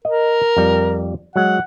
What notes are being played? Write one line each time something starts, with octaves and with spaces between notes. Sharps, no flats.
A#4 D#5
F2 G3
F#3 G#3 F#5